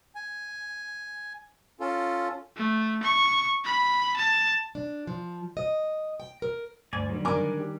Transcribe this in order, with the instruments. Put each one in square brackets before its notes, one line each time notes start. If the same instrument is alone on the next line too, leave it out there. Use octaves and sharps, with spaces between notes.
[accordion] G#5
C#4 F4 A4
[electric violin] A3
C#6
B5
A5
[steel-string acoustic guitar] D4
F3
D#5
G5
A#4
[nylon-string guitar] D2 [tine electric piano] G2 [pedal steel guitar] D5 G#5
[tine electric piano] D3 F#3 [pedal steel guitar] D#3 G3
[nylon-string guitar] D4 A#4 [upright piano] G#5 D6
[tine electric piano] G4